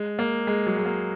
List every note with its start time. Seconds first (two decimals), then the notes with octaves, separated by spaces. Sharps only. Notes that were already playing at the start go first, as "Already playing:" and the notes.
Already playing: G#3
0.19 A#3
0.47 G#3
0.67 F#3
0.78 G#3
0.86 A#3